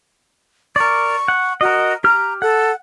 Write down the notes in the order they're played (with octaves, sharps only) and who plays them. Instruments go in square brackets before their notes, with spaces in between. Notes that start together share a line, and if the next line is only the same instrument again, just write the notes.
[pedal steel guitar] A#4 D5 [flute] C#6
[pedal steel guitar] F#5
[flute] F#4 [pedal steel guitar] A#4 D#5
[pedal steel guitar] G4 F6 [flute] A#5
[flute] A4 [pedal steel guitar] F#5